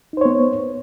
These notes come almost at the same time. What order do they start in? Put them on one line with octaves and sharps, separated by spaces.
D#4 C5 C#5 B3